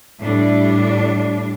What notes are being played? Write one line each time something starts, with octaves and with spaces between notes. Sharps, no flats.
A2 G3 D4